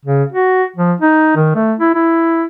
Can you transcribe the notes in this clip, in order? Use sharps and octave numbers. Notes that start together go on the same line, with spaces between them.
C#3
F#4
F3
D#4
D#3
A3
E4
E4